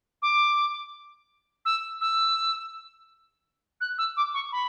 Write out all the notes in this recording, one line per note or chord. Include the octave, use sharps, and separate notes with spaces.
D6
E6
E6
F#6
E6
D6
C#6
B5